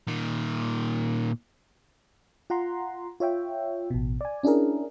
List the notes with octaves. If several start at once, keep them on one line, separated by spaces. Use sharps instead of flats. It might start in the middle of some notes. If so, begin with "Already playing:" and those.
A#2 D#3
F4 F#5 A#5 C6
F4 C#5 E5 G5
A1 B2
D5 G#5
C#4 D4 E4 G#4 A#4